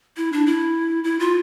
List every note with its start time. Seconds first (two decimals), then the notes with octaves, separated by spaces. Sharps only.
0.17 E4
0.32 D4
0.46 E4
1.04 E4
1.19 F4